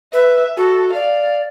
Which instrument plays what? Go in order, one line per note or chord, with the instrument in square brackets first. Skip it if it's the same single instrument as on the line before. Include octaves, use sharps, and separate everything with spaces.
[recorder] B4 [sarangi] E5
[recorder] F#4 [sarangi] A4
[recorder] D5 [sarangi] F5